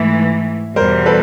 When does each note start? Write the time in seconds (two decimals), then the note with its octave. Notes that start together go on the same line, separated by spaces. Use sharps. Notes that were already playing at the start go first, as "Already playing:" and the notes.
Already playing: G#2 E3 A3 E5
0.76 E2 B2 G3 A#4 C5
1.06 A4 B4